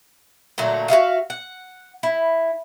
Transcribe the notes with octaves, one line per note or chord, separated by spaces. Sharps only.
A#2 D3 F#3 A3
F#4 G#4 E5 F5
F#5
E4